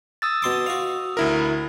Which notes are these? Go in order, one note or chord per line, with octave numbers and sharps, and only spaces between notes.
D#6 E6 A6
B2 C6 D6
F#4 F5
D2 E4 A#4